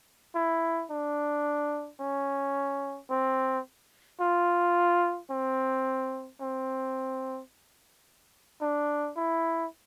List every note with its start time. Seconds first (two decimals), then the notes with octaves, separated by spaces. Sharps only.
0.35 E4
0.91 D4
2.00 C#4
3.10 C4
4.21 F4
5.30 C4
6.42 C4
8.62 D4
9.17 E4